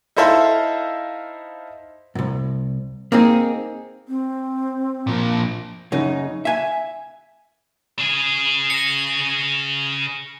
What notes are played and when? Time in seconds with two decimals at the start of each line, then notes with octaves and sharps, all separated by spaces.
0.16 D#4 E4 A4 C5 E5 F5
2.15 C2 F#2
3.12 A#3 C4 D#4 G#4
4.07 C4
5.07 A#2 F3
5.92 F#2 C#3 D#4
6.45 E5 G#5
7.99 C#3 G#4
8.70 A#6 C#7